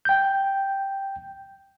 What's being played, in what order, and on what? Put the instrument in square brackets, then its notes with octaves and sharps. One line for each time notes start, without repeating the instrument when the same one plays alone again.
[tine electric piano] G5 G6